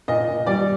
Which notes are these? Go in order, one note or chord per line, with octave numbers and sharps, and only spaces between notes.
A#2 D#5
A#2
G3 D5